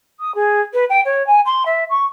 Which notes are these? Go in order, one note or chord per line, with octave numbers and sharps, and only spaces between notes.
D#6
G#4
B4
G5
C#5
G#5
C6
E5
C#6